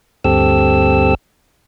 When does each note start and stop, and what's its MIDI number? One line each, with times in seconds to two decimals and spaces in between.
0.24 1.15 38
0.24 1.15 43
0.24 1.15 60
0.24 1.15 67
0.24 1.15 69
0.24 1.15 88